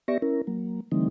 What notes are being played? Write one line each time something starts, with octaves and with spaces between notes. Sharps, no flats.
B3 G4 D5 E5 C#6 A#6
C#4 E4 A#4
F#3 A#3
D3 E3 G3 A3 C4 D#4